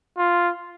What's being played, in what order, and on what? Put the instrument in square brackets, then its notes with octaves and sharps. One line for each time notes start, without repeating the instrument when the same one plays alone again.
[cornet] F4